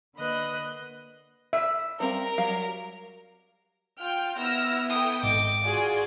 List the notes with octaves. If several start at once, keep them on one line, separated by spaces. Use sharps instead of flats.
D3 A#3 B4 D#5 F#6
E5
G3 C4 A#4 F5
F#3 G3 F5
F4 G5 F6
B3 E4 E6 F6 A#6
A4 G5 D#6
G#1 D#5 D6
F4 F#4 G#4 D5 G#5